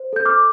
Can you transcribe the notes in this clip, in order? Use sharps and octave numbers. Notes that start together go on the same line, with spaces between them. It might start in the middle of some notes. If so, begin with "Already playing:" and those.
Already playing: C5
A4 G6
D6 F6